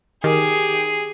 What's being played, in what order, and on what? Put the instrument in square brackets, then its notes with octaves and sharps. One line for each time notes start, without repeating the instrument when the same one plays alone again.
[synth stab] D#3 [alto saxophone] G4 [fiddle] G#4